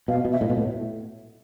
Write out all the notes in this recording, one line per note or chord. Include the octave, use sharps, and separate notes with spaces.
B2 F5
B2
E5
A2
B2
A2